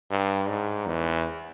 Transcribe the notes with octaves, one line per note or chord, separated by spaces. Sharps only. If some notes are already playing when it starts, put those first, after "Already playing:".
G2
G#2
E2